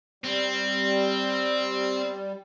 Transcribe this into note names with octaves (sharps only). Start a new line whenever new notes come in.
G3 C4